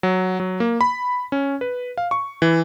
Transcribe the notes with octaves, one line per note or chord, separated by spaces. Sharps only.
F#3
F#3
A#3
B5
C#4
B4
F5
C#6
E3